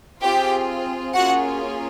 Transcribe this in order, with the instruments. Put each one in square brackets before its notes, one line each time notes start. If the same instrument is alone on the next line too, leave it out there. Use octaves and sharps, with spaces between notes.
[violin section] C4 F4 G4 G#4 G5
A#3 C#4 F4 F#4 G#4 F#5